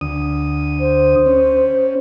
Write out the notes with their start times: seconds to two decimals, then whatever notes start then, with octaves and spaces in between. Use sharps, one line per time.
0.01 D2 D#6
0.80 C5
1.26 C#4